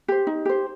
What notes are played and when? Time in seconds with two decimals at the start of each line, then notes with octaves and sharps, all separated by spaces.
0.08 G4 C5
0.27 D#4
0.45 G4 C5